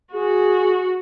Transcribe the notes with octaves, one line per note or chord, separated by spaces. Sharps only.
F#4 G#4